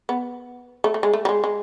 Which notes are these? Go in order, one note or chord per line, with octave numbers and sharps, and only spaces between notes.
B3
A3
A3
G#3
A3
G3
G#3
G#3